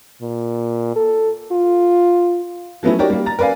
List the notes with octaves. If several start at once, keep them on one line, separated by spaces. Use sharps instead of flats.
A#2
A4
F4
F3 F#3 A3 B3 C#4 E4
D#4 F#4 G4 A#4 C#5 D5
G3 A#3
A#5 A6
A#4 B4 D5 F5 G#5